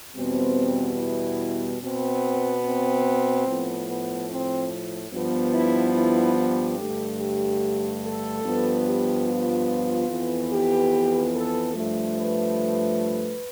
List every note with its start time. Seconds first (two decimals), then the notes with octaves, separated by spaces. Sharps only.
0.15 E2 B2 G3 B3 C4
0.98 E4
1.81 B2 B3 C4
2.64 C4
3.47 A2 F3 B3
3.88 B3
4.29 C4
5.12 G2 F3 B3
5.54 E4
5.94 E4
6.36 G4
6.78 G2 D3 A3
7.19 G4
8.02 A4
8.43 G2 F3 B3
8.85 G4
9.27 F4
10.09 F2 E3 B3
10.51 G4
11.33 A4
11.74 G2 F3 A3
12.16 B4